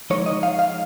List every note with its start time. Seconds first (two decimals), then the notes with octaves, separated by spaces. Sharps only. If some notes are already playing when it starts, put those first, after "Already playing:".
0.10 F3 G#3 D#4 C#5
0.26 D#5
0.43 F5
0.59 F5